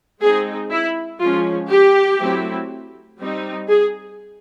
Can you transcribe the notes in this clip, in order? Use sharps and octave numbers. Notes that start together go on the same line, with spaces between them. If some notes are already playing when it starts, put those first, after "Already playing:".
G#3 C4 D#4 G#4
E4
F3 G#3 C#4 F4
G4
F#3 A3 C4 E4
G3 C4 D#4
G#4